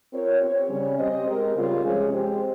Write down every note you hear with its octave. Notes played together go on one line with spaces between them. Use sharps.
C4 F4 A#4 C#5
C4 G4 C#5
C#3 G3 C#4
C4 G4 C5 D#5
G#3 C4 G4 A#4
C#3 G3 C4 F4
C3 F3 G#3 C#4 G#4
G#3 C4 G4 C5